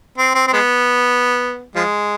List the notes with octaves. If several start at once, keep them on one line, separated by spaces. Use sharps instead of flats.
C4
C4
C4
G#3 B3
F3 G#3